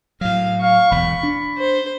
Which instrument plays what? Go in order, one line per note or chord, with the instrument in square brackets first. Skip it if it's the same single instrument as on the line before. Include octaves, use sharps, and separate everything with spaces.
[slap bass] A2 F#3 [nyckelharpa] F5
[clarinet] F5 [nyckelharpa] C#6
[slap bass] E1 E2 [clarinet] B5
[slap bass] D4
[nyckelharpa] C5